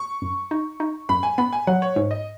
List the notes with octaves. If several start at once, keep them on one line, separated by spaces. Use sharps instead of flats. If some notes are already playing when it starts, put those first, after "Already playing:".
Already playing: C#6
F#2
D#4
D#4
F#2 B5
G#5
B3 B5
G#5
F#3 F#5
C#5
G#2
D#5